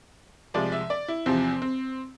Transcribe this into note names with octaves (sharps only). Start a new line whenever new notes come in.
C2 C3 F3 G#3 D5
E5
D5
E4
E2 C3 F3 C4
C4